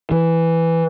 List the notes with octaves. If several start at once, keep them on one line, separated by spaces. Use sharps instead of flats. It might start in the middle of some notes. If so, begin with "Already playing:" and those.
E3